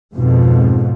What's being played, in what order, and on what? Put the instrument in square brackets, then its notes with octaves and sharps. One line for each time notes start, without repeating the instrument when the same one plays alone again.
[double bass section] F2 G#2 B2